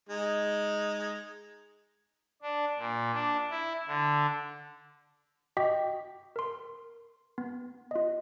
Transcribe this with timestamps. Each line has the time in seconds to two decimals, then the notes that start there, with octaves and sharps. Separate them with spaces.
0.09 G#3 D#4
2.42 D4
2.78 A#2
3.13 D4
3.50 E4
3.87 D3
5.57 F#4 D#5 G5 D6 B6
6.36 A#4 C6
7.38 B3
7.91 F4 D#5